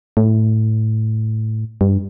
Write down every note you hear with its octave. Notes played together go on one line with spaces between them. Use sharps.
A2
G2